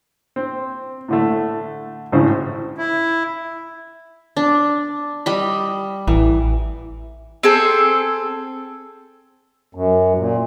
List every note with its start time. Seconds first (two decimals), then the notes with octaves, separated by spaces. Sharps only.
0.36 C4
1.08 A2 D3 A3
2.12 G#1 A2 C#3 C5
2.78 E4
4.37 D4
5.26 G3 D#5 B5
6.07 A1 E3
7.43 C4 G#4 A4
9.75 F#2
10.18 A#2